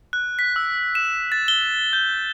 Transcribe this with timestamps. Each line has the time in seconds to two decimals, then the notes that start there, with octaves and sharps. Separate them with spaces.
0.13 F#6
0.39 B6
0.56 E6
0.95 E7
1.32 A6
1.48 G7
1.93 G6